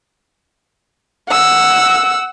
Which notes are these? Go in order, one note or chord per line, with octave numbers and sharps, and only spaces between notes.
F#5 E6